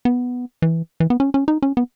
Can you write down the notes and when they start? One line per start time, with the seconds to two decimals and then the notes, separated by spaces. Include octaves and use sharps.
0.05 B3
0.62 E3
1.00 E3
1.10 B3
1.20 C#4
1.34 C#4
1.48 D#4
1.62 C#4
1.77 B3